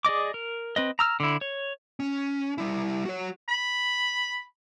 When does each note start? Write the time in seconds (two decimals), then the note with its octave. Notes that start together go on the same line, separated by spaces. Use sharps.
0.05 G#4 D5 D#5 D6
0.34 A#4
0.76 C4 B4 D#5
0.99 A#5 E6 F6
1.20 D3 E4
1.41 C#5
2.00 C#4
2.58 G3 E4
3.06 F#4 C#5
3.49 B5